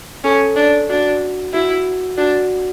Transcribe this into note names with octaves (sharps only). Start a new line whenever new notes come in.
C#4 A4
D4
D4 F#4
E4 F#4
D4 F#4